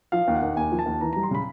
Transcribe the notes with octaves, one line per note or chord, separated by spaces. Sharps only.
F3 F5
D#2
F#5
D#2
D#2 G#5
F3
A5
D#2
E3 A#5
G3 A#5
C6
C#3 B5